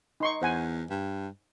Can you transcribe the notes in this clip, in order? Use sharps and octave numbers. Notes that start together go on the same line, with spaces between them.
D#4 C6 C#6
E2 C5 F#5 G#5
G2